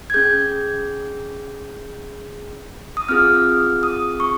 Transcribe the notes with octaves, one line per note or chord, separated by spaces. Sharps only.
G#6
C#4 G#4 G6
D#6
C4 F4 G#4 F6
D#6
C#6